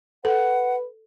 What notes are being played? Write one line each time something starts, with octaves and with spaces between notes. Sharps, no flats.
A4 B4 F#5